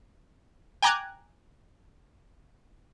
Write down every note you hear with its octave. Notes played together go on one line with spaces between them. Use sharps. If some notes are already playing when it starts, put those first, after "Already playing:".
G5 G#5 A#5 D6 F#6 G#6